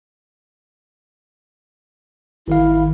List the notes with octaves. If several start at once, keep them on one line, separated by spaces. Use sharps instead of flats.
G#1 D#3 E4 F5